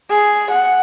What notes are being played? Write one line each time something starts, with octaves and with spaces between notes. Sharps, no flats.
G#4
F#5